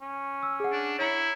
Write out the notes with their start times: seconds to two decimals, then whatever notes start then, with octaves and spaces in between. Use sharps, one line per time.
0.02 C#4
0.43 E6
0.60 G#4 F#5
0.72 D4
0.99 E4 C#5 A#5 C#7